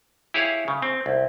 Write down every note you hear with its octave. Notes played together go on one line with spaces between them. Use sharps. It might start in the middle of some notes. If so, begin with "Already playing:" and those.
E4 G4 G#4 C#5 F5
C#3
C4
C2